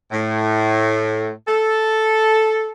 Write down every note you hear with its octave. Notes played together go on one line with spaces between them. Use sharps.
A2
A4